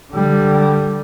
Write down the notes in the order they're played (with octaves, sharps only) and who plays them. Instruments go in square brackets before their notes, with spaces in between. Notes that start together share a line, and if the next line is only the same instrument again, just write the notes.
[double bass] D3 G3